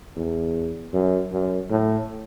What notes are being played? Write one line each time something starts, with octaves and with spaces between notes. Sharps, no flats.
E2
F#2
F#2
A2